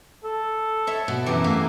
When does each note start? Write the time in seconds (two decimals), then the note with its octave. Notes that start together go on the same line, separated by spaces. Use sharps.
0.24 A4
0.87 C#5 E5
1.08 B2
1.26 F#2 E3 G4
1.44 A3 A#3